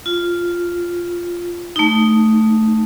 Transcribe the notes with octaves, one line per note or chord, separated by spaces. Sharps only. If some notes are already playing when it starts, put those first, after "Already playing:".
F4
A3 D#4